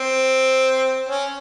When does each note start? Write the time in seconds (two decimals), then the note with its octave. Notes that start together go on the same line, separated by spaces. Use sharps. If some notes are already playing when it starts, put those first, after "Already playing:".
Already playing: C4
1.09 C#4